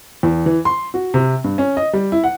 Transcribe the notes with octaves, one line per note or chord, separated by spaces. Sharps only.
E2
E3
C6
F#4
C3
G2
C#4
D#5
G3
E4
F#5